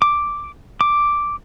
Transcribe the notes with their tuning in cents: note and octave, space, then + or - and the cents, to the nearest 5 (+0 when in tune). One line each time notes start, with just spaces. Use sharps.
D6 +0
D6 +0